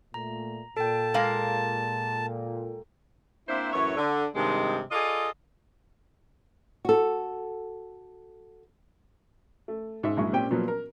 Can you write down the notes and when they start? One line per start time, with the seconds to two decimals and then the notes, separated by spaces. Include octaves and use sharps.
0.14 A#2 A3 A#5
0.77 A#2 A4 G5 A5
1.14 G#3 A#3 F5
3.48 A#3 C4 D4 E4 C5 E5
3.72 F#2 A2 E3 C#5
3.97 D3
4.35 G2 C3 D#3 G#3
4.91 F4 G#4 A4 D5 D#5
6.85 F#4 A4
9.68 A3
10.03 G#2 E5
10.17 A#1 F#3 G#3 E4 C#6
10.33 A#2 C4 C#4 G4 G5
10.51 A#2 F3 F#3 B3
10.68 A#4